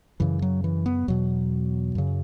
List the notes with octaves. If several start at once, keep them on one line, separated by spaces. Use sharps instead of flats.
F#2 C#3 E3
F#3
E3
B3
E2 B2 F#3
F#2 C#3